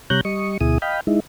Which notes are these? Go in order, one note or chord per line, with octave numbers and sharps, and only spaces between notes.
C3 G3 C#5 A#5 F#6 G6
G3 D#5 C#6
D2 B2 E4 G#4 D#6
D#5 F5 G5 B5
G#3 D#4 E4